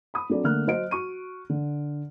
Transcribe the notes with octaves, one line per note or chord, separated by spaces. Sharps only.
B5 D#6
F#3 C4 D4 A4 D5
D3 A3 A#3 F6 F#6
F#3 C5 D#5 D7
F#4 C#6 D#7
D3